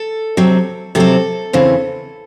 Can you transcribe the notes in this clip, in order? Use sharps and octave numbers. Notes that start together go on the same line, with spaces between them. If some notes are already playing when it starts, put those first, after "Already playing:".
Already playing: A4
C3 F#3 C4
C3 F#3 C4 A4
E2 C#3 E3 C4